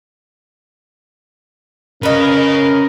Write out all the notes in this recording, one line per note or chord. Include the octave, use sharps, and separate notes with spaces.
C#3 C#4 A#4 B4 D#5